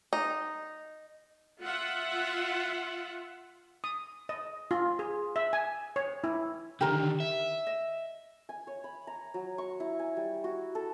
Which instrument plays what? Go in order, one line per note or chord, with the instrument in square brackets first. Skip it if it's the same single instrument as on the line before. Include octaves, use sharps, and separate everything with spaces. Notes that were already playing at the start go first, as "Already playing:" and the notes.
[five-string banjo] D#4
[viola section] F4 E5 F#5
[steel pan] D#6
D#5
F4
G#4
E5
G#5
C#5
E4
[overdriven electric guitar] D3 D#3 [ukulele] G4 A#4 A#5
[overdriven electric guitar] E5
[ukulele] D#5
[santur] G#5
C#5
B5
A#5
F#3
C#6
E4
G#5
G3
F#4
A4